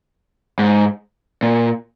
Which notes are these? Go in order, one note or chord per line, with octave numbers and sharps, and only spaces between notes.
G#2
A#2